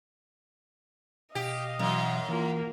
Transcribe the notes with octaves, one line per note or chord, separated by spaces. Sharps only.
B2 G4 D#5 F5
F#2 B2 E3 F#3
E3 A#3 F4